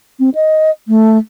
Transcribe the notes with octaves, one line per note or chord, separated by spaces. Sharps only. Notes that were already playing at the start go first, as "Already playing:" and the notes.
C4
D#5
A3